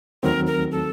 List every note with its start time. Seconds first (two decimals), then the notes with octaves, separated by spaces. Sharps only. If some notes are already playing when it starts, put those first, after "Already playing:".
0.23 D#2 D#3 F#3 A3 C4 A#4
0.47 A#4
0.72 A4